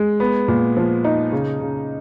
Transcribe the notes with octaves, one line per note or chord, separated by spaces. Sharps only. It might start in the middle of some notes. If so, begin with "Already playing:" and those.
Already playing: G#3
B3
A#2
F3
D#4
C#3
C#3